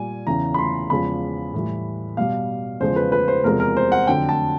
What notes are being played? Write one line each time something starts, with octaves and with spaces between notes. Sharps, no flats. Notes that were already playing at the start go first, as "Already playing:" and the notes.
Already playing: A#2 G3 G#5
E2 C#3 E3 A#5
B5
C6
E2 C#3 F3 G#3 B5
A2 E3 G3
B2 G3 F5
E2 C#3 F3 G#3 C5
B4
B4
C5
E2 C3 F3 G#3 A#4
A#4
C5
F#5
F2 D3 F#3 G5
A5